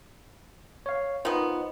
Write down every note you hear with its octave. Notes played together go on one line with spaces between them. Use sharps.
C#5 F5
D#3 B3 F4 C5 D#5